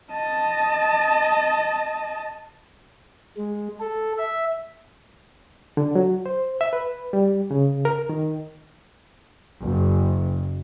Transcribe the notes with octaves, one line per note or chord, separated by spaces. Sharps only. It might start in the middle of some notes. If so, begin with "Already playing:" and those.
D#5 A5
G#3
A4
E5
D3
F#3
C5
E5
B4
G3
C#3
A#4
D#3
F#1